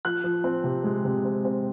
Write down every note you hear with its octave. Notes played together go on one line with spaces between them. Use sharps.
F3 F#6
F3
C4
C3
G#3
C3
C4
C4